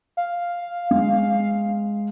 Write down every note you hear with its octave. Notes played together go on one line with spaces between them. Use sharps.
F5
G#3